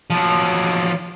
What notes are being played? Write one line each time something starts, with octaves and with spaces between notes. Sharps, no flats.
F3 F#3